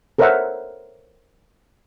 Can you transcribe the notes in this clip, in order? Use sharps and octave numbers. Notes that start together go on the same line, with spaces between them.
A4 A#4 C5 C#5 E5 F#5